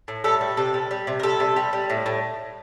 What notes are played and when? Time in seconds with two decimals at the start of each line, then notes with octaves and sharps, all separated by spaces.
0.08 A2
0.24 G3 A4
0.41 G3
0.57 C3 A4
0.74 G3
0.91 G3
1.07 C3
1.20 A#4
1.23 G3 A4
1.40 C3
1.56 G3
1.73 G3
1.90 A2
2.06 A2